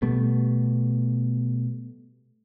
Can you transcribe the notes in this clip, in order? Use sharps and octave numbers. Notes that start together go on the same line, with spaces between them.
B2 G3 A3 B3